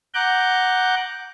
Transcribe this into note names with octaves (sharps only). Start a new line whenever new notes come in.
F#5 A#5 D6 F#6 G6